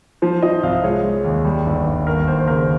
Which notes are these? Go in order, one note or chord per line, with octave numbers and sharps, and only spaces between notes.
F3 C5
F3 D#5
C2 F5
G#3 C#5
G#3
D#2
G3
G1
G1
D#2 A#4
D#2 C5
C5
C#3 A#4